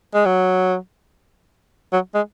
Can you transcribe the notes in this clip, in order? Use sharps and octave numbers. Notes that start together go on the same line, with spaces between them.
G#3
F#3
F#3
G#3